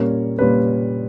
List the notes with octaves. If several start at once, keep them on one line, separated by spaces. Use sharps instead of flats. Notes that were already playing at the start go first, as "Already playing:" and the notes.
Already playing: A#2 G3 C#4 A#4 C#5
A#2 G3 C#4 B4